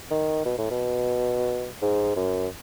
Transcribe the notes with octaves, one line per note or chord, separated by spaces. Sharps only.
D#3
B2
A2
B2
G#2
F#2